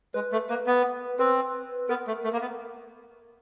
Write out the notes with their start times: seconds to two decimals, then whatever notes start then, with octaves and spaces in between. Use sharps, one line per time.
0.14 G#3 B4
0.32 A3
0.49 A#3 B4
0.67 B3
1.19 C4 B4
1.89 B3 A#4
2.07 A3
2.24 A3
2.33 A#3
2.41 B3